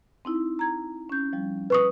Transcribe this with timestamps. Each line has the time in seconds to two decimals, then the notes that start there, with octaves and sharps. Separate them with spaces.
0.25 C4 D#4 E4
0.59 A#5 G#6
1.09 C#4 G6
1.33 F3 G3
1.70 B4 C#6 D#6